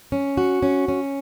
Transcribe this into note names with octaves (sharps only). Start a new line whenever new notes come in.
C#4
F#4
C#4
C#4